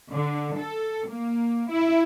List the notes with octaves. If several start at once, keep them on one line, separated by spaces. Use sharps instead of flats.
D3
A4
A#3
E4